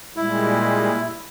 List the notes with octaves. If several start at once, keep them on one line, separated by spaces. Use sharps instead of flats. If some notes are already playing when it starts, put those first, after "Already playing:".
A#2 G3 G#3 E4